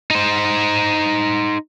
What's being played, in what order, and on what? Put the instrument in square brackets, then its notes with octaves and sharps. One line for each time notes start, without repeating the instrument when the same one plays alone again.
[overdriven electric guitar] D#4 C5